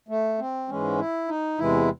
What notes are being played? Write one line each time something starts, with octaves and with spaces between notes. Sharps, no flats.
A3
C4
G#2 E3 G#3 C#4
E4
D#4
E2 C3 E3 G#3 E4